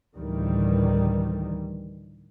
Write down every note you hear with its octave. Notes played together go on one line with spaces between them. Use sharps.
D2 A2 D#3 E3 G3